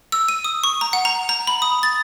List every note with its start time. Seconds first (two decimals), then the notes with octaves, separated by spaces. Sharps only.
0.12 E6
0.28 D#7
0.44 D#6
0.64 C#6
0.81 A#5
0.93 F#5
1.05 A#5
1.29 A#5
1.47 B5
1.62 D#6
1.83 A6